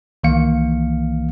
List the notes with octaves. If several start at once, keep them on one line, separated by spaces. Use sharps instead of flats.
C2 D#3 E3 A#3 F5 C#7